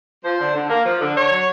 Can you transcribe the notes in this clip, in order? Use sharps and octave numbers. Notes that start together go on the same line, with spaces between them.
F3 C5
D3
D3
A#3
F3
D3
D3 C#5
F#3